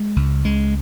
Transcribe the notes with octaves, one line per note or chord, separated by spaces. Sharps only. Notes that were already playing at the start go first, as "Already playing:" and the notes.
Already playing: G#3
C#2
C#2 G#3